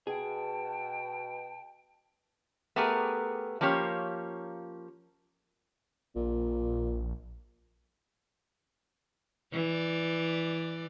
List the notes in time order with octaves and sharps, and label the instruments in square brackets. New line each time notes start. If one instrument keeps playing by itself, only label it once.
[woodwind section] B2 [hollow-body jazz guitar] G#4 [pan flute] G5 [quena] A5
[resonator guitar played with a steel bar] A3 B3 G4 G#4 A#4
F3 A#3 C#4 G4 C#5
[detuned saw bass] A#1 [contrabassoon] A#2
[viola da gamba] E3 D5